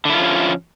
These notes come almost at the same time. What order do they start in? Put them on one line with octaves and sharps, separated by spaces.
D3 E4 F4 F3 C#4